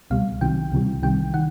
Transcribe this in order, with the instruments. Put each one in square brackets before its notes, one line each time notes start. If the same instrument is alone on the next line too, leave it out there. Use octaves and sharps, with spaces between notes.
[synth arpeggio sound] C#2 B2 G3 F5
C2 C3 D#3 F#3 G5
C#2 C3 E3 G3
C2 C3 D#3 G3 G5
D#3 F#5